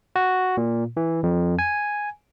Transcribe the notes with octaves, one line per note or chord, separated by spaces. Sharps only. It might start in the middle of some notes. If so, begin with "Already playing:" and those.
F#4
A#2
E3
F2
G#5